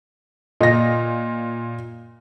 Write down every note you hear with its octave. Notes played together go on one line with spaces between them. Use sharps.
A#2 D#5 A#6